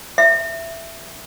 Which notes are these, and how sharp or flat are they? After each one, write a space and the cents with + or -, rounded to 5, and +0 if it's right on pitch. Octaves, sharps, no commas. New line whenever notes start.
E5 +10